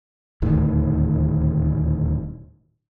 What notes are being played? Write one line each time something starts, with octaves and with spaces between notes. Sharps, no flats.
D#1 D2 A2 D#3